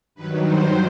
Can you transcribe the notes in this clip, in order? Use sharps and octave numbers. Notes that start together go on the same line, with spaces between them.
G2 D#3 F#3 B4
C5